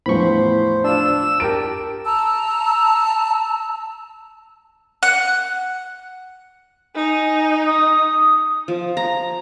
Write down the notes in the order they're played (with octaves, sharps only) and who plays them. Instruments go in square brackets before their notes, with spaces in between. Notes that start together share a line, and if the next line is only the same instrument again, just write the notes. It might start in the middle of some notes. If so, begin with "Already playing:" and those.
[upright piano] E2 A2 F3 [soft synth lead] C5 [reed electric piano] B5 C#6
[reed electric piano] D4 F4 [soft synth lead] E6
[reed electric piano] G4 A#4 A5 [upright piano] D7
[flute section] A5 A#5 E6
[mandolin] F#5
[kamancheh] D#4 [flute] G#5
[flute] D#6
[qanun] F3
A#5